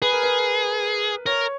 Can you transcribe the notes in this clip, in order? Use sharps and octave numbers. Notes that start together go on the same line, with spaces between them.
G#4 B4
A#4
B4
A#4 C#5